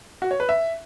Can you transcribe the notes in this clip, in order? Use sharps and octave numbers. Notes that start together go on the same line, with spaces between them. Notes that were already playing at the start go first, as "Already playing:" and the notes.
F#4
C#5
B4
E5